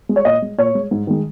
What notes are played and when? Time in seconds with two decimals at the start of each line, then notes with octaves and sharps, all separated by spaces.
0.09 G#3
0.16 C#5
0.25 A#2 D#5
0.42 G#3
0.58 A#2 C#5
0.75 G#3
0.91 G#2
1.07 D#3 G#3